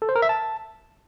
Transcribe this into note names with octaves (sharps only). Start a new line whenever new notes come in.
A4
C5
A#4
E5
A5